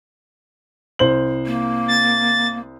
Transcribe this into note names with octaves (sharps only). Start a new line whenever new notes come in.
C2 C5 F#7
A#3
A6